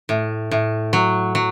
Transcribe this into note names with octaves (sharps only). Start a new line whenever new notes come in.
A2
A2
F#3
F#3